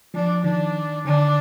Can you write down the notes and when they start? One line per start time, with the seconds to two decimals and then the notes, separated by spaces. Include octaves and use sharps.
0.14 F3 D4
0.44 D#3 D4
1.05 D3 D4